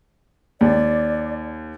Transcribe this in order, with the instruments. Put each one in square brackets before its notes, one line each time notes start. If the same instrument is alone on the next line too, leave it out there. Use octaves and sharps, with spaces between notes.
[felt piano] D#2 [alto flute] D5